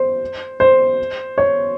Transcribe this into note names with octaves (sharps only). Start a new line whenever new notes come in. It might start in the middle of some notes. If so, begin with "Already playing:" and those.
Already playing: C5
C5
C#5